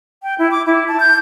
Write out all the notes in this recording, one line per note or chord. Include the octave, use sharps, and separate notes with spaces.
G5
E4
D6
E4
A5
G6